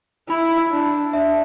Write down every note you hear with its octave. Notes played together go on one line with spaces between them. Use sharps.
E4 B5
D4
D4 E5